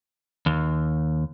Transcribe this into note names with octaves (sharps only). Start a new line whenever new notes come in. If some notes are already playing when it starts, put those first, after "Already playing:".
D#2